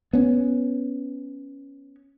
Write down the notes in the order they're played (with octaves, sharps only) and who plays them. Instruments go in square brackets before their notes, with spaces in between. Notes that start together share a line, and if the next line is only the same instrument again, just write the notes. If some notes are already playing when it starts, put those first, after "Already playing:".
[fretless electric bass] B3 C#4